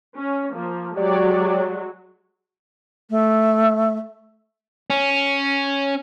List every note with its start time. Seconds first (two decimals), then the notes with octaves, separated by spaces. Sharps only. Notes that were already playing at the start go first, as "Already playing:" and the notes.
0.16 C#4
0.53 F3 A#3
0.96 F#3 G#3 F#4 G4 C#5 D5
3.10 A3
4.90 C#4